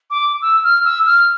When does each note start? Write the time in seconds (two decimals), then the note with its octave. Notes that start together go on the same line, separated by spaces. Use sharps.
0.11 D6
0.42 E6
0.64 F6
0.85 E6
1.06 F6